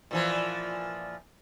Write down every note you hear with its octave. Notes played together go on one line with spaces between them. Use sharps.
A#2 E3 F3